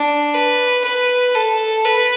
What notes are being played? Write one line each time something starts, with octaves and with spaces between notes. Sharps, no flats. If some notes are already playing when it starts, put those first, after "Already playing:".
Already playing: D4
B4
B4
A4
B4